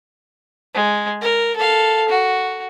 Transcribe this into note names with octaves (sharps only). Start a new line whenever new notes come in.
G#3
A#4
A4 F5
F#4